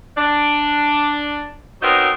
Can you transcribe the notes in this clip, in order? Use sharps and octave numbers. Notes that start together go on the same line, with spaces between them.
D4
F#3 B3 C4 D#4 A#4